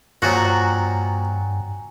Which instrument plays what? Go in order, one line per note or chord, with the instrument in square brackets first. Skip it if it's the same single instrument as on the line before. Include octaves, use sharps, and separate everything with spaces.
[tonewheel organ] G2 [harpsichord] A#2 F3 F#3 [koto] F#4 [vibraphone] G5 G#5 A#5